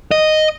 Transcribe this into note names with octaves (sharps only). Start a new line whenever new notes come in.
D#5